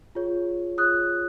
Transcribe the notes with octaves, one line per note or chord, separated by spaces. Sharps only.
F4 G#4 C#5
F4 G#4 C#5 D#6 F#6